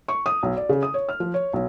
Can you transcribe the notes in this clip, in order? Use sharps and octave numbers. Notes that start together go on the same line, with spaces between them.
C#6
D#6
B1
D5
C#3
D#6
C#5
F6
F3
C#5
B1